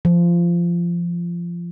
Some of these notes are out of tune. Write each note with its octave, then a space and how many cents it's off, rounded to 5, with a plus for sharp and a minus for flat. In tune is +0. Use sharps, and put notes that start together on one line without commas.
F3 -20